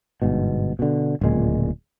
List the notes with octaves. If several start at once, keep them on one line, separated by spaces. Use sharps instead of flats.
G1 G#2 B2
B2 D3
D1 C#2 A#2 G#3